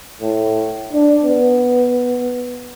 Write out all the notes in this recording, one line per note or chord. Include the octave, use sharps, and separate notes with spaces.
A2
D4
B3